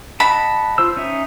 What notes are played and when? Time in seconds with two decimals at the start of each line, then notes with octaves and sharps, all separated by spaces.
0.20 D#5 F#5 A5 B5
0.78 F4 C5 E6
0.97 C#4 D#4 E5